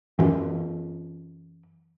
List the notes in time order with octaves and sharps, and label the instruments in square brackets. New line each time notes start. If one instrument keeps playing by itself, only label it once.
[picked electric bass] F#2 E3